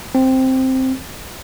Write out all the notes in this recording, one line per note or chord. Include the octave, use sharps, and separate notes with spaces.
C4